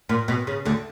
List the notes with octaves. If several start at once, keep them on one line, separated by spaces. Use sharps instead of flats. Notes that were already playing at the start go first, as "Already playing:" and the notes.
A#2
B2
C#3
D2 D3